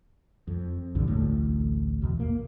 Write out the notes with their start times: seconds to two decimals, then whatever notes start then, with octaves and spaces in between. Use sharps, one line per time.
0.47 F2
0.95 A#1 E2 G2 D3
1.08 A1 D2 A2
2.02 E2 B2
2.20 A#3